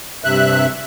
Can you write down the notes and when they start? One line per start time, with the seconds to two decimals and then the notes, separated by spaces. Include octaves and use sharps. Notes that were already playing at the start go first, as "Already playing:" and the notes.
0.24 G2 C3 E5 F#6